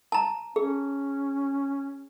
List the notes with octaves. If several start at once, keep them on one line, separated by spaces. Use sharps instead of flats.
A5 A#5
C#4 G#4